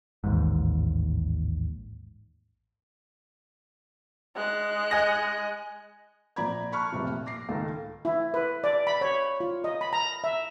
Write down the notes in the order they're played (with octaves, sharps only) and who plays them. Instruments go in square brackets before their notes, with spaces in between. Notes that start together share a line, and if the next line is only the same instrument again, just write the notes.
[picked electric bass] A1 D#2 G#2
[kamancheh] G#3 F#6
[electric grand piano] D#5 G#5 A#6
[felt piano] A#1 F3 D5 A#5 B5 G#6
A5 B5 C#6 F6 F#6
F1 C3 F3
A#1
D6 A#6 C7
C#2 D#3 D#4 A4 F5
[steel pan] E4
B4
D5
B5
C#5
F4
D#5
B5
A#5
E5